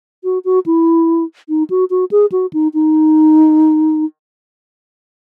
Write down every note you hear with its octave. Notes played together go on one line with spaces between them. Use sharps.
F#4
F#4
E4
D#4
F#4
F#4
G#4
F#4
D#4
D#4